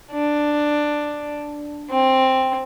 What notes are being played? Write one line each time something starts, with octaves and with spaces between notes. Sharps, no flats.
D4
C4